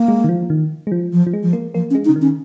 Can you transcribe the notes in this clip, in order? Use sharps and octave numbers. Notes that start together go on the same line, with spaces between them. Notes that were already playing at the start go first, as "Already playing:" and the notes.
Already playing: A#3
G#3
D#3
F3
D#3
G#3
F3
F3
F3
G#3
F3
A#3
F3 A#3
C#4
G#3
D#4
C#3
D#3
C#4